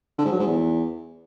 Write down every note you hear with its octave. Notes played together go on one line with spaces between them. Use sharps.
D3
G#2
F#3
G#2
E2